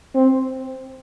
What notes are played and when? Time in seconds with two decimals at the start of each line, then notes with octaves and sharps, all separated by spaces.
0.15 C4